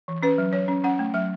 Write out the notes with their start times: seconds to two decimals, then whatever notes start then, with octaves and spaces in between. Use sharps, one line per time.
0.08 E3
0.23 C#4 B4
0.38 F#3
0.53 F#3 C#5
0.68 C#4
0.84 C#4 F#5
0.99 A3
1.14 F#3 E5